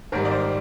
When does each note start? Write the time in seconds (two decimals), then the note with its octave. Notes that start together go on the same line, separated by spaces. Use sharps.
0.12 G#2 D#3 G3 A#4
0.25 D5
0.31 C5